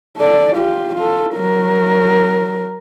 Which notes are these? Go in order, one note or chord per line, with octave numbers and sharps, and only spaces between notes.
A4 D5
F4 G4
F4 A4
F#3 A#4